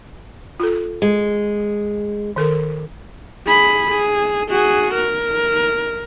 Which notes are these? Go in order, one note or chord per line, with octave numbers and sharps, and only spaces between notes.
F4 A4
G#3
D#3 A4 A#4
G#4 B5
G#4
F#4 G#4
A#4